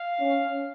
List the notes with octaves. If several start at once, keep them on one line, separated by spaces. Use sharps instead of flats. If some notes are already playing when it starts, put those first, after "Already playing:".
Already playing: F5
C#4